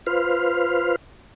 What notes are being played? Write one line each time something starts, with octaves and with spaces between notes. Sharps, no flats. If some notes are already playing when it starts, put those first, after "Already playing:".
F4 B4 C5 F6